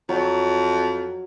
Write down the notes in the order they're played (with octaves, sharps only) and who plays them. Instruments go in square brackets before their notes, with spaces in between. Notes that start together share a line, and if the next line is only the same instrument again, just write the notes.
[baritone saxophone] F2 [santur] F#3